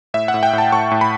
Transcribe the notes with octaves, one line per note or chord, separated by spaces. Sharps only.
A2 E5
F#5
A2
G5
A2
A5
A2 C#6
A2
B5